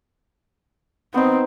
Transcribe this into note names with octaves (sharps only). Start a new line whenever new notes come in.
B3 C4 D#4